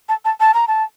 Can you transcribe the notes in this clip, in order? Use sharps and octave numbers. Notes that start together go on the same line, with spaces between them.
A5
A5
A5
A#5
A5